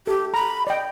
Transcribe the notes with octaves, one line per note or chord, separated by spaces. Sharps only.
G4 A4
A#5 B5
D5 D#5 G5